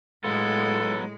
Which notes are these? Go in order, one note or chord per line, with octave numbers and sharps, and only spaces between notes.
A2 F#3 G#3 B3 F4 A4